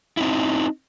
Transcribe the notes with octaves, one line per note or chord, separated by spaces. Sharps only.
C4 D#4 E4